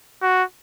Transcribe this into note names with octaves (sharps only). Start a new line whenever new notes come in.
F#4